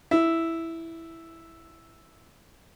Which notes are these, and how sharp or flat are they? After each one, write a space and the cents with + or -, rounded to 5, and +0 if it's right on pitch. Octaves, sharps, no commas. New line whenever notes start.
E4 +0